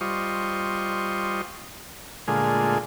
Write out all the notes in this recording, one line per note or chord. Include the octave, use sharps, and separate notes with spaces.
G3 F4 C5 D#5 C#6
A#2 D3 G#3 A3 F4 G#4